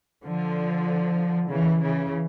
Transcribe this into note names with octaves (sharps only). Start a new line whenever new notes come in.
D3 F3
C#3 E3
C#3 E3